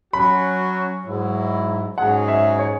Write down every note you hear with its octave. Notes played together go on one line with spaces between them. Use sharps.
F#3 C#4 F#4 B5
G#2 F#3 E4
G#2 F#3 C#4 G#4 F#5
E5
C#5